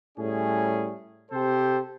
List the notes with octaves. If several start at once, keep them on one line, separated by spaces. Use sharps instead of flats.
A2 G3 C#4 G#4
C3 G4 A4 C5